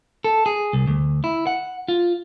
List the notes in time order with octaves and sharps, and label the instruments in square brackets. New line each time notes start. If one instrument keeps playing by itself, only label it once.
[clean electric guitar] A4
G#4
C2
D2
E4
F#5
F4